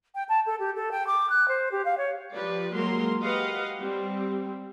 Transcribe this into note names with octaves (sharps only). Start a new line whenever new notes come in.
G5
A5
A4
G4
A4
G5
D6
F#6
C5
G4
F5
C#5
F3 G4 B4 D5
F#3 G#3 A#3 A#4 C6
G4 B4 D#5 F5 F#5
G3 C4